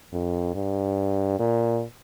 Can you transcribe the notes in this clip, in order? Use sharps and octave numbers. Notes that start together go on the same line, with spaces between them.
F2
G2
A#2